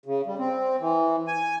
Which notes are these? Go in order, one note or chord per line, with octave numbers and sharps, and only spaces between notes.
C#3
G3
C4
E3
G#5